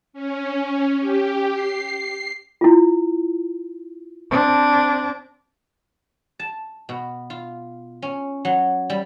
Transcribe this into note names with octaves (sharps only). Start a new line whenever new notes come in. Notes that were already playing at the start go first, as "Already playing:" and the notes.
C#4
G4
C7
E4 F4
C4 D4
A5
B2
F4
C#4
F#3
G3